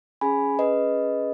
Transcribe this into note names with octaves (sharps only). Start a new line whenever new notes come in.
C#4 G#4 G#5 B5
B4 D#5